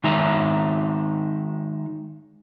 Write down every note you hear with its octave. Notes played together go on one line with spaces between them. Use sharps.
D#3 G#3 D#4 E5 A#5